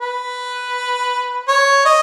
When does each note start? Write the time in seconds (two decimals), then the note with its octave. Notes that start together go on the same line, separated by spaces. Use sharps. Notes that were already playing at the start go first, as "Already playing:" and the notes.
0.01 B4
1.48 C#5
1.85 D#5